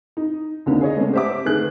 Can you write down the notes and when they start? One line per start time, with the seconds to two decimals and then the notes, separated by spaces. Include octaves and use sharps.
0.17 D#4
0.66 D#2 D3 A#3 C4 D#4
0.81 G#4 C#5 D#5
0.96 C#3 G#3 A3 B3 C#4 D4
1.13 G4 C5 E5 F#5 D6
1.44 D3 D#3 A3 G#4 B4 F#6